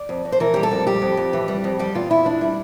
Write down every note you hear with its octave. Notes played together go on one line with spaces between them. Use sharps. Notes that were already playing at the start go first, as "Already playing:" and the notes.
Already playing: D5
F2
F2
C5
E3 A#4
G3 G4
A4
F2
G3 G4
F2
F2
E3
G3
F2
G3 G4
E2 F4
E2 E4
E3 D4
G3 E4